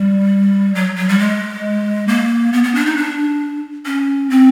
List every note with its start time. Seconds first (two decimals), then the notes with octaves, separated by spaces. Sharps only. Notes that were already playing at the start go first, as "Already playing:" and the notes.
Already playing: G3
0.75 F#3
0.97 F#3
1.09 G3
1.19 G#3
2.08 A#3
2.53 B3
2.64 B3
2.75 D4
2.86 D#4
2.97 D4
3.86 C#4
4.30 C4